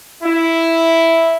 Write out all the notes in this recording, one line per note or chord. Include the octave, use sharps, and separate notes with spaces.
E4